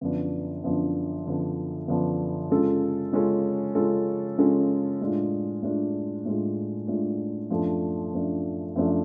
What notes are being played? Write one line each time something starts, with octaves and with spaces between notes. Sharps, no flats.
F#2 D3 F3 B3 D4
F#2 D3 F3 B3 D4
F#2 D3 F3 B3 D4
F#2 D3 F3 B3 D4
C#3 G#3 C#4 F4 A4
C#3 G#3 C#4 F4 A4
C#3 G#3 C#4 F4 A4
C#3 G#3 C#4 F4 A4
A2 G#3 D4 F4
A2 G#3 D4 F4
A2 G#3 D4 F4
A2 G#3 D4 F4
F#2 F3 A3 D4
F#2 F3 A3 D4
F#2 F3 A3 D4